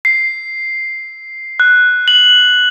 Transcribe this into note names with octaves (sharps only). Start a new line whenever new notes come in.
C7
F#6
F#7